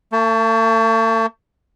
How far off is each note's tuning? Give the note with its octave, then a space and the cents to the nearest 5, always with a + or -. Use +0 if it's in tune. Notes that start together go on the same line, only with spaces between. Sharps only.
A3 +45 A5 +0